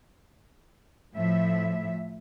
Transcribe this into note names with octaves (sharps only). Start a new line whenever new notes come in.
A2 F3 E5